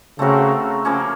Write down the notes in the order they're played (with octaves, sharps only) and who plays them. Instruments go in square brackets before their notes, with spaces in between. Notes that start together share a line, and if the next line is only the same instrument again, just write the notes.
[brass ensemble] C#3 [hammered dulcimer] A3 C4 F#4 A#4
[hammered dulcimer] C#3 F3 A#3 C#4